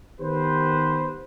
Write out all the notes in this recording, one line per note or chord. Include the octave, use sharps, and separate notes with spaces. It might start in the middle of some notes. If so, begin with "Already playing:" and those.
D#3 B3 G4 B4 C5